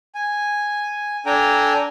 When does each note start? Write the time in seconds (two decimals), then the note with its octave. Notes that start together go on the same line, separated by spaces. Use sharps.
0.15 G#5
1.26 D4 A4 G5 G#5 A#5